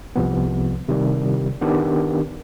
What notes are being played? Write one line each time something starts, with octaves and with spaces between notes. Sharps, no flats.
C2 C3 F3 B3
C3 D#3 G3
D#3 B3 D4 G4